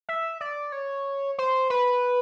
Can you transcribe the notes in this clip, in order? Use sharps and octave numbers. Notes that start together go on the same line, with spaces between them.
E5
D5
C#5
C5
B4